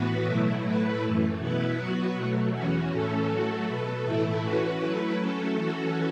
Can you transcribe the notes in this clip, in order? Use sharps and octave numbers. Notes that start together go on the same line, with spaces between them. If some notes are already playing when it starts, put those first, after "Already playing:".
Already playing: A2 E3 B3 F#4 B4
B2 F#3 A3 E4
A2 A3 E4 B4
F#2 E3 A3
B2 B3 E4 B4
F#3 B3 F#4 B4
B2 F#3 A3
E2 E3 C#4 F#4
A2 E3 A3 C#4 A4
F#3 A3 F#4 A4
B2 B3 A4
A2 E3 A3 E4 A4
E3 C#4 F#4 B4
F#3 A3 E4 B4
F#3 A3 C#4 A4
E3 C#4 F#4 A4